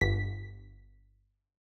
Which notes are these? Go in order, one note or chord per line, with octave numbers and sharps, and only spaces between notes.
G1 B6